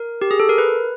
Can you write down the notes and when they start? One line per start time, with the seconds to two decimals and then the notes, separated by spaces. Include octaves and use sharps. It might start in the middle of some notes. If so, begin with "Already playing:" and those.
Already playing: A#4
0.22 G4
0.31 G#4
0.40 A4
0.49 A#4
0.58 B4